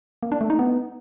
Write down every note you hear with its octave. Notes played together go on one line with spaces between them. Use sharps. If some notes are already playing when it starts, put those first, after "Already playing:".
A#3
D4
A3
D#4
B3